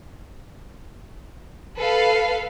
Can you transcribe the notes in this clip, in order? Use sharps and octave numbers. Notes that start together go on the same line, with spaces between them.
A4 B4 F5